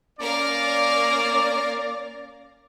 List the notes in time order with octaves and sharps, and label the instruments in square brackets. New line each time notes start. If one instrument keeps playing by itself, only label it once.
[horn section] A#3 C#4 D5 [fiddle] A#4 F5